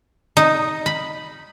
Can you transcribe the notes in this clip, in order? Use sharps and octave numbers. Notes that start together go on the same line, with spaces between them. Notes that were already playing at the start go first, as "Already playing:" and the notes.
D#4
B5